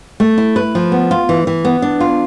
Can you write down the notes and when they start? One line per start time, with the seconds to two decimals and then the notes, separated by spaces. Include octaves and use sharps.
0.20 A3
0.38 E4
0.56 B4
0.75 F3
0.92 B3
1.11 F4
1.29 E3
1.47 E3
1.65 B3
1.82 D4
2.00 F4